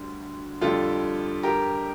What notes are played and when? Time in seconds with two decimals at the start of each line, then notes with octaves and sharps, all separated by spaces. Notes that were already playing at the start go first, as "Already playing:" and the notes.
Already playing: D2 D3 G3
0.61 F2 D3 G3 F4 A4
1.43 G4 A#4